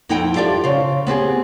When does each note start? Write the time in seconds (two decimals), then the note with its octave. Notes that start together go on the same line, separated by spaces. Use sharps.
0.09 F2 D#4 E4 A4 F#5 G5
0.36 F4 G4 A4 D5 E5 F5
0.64 C#3 C5 F5
1.07 B3 C4 G4 G#4